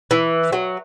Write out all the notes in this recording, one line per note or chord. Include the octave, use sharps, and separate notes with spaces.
E3
F#3